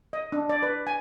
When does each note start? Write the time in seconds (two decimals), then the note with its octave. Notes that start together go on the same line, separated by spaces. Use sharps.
0.13 D#5
0.32 D4
0.49 D5
0.63 B4
0.87 G#5